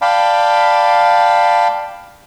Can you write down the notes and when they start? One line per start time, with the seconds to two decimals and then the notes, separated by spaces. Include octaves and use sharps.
0.02 D5 F5 G5 A5 B5